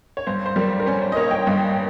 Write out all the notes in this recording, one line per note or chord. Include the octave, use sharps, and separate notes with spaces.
C#5
G2 C5
C5
G3 A#4
A#4
C#4 C5
C5
D#5
A#3 A#4 C#5
D#5 G5
G2